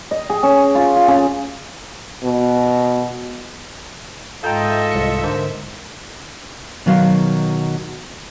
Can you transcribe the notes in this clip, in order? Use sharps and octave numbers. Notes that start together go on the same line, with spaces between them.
D#5
G#4
C#4
F4
F4
C#3
B2
G#2 F4 A4 D#5 E5 G5 A#5 G6
C2 C#7
D3 A#4 C5
B2 D#3 F#3 F#4 F5